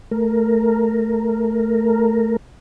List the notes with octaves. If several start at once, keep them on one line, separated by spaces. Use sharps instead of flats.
A3 A#4